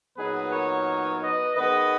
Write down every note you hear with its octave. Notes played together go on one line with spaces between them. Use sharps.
A#2 F#3 B3 D#4 G#4 B4
A#4 C#5
B4 D#5
D#3 G#3 B3 B4 D#5